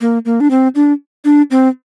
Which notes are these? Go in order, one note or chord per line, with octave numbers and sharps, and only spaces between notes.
A#3
A#3
D4
C4
D4
D4
C4